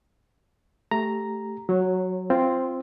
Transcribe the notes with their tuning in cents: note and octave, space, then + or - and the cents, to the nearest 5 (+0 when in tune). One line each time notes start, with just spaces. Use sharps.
A3 +0 G4 +0 A#5 +0
F#3 +0 C#5 -25
C4 +0 F4 -15